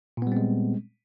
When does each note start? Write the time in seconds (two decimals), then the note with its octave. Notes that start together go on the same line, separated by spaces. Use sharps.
0.17 A#2
0.22 B3
0.27 G3
0.32 C4
0.37 G#3